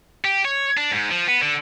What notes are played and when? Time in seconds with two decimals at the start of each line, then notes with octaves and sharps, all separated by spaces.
0.25 G4
0.45 C#5
0.77 D4
0.92 G#2
1.11 F3
1.28 B3
1.42 D3